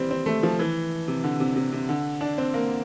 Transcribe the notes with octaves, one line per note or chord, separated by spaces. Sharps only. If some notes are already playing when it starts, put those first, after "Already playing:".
Already playing: E3 G3 C4
C4
A3
F3
E3
C3
D3
C3
C3
C3
D3
D4
C4
A#3